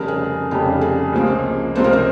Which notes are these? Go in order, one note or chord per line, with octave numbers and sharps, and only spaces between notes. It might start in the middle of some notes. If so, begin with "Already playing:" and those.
Already playing: F1 F2 C#3 G3 A#4
G#4
F1 F2 C#3 G3 G4
G#4
C#2 C3 F3 A#3
C#2 C3 F3 A#3 C5
A#4
C5